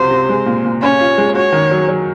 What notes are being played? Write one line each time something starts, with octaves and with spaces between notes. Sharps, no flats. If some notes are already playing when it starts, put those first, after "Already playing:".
Already playing: C#2 C3 F#3 C5
C3
G#3
A#2
A#2
C#4 C#5
F4
G#3
F#4 C#5
D#3
F#3
F#3